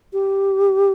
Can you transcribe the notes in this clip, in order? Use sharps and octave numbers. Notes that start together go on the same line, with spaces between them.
G4